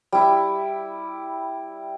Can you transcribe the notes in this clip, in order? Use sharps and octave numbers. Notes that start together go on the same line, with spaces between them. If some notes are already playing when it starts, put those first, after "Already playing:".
G3 E4